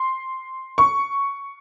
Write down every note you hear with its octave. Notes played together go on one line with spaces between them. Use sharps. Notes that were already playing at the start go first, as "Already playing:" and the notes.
Already playing: C6
C#6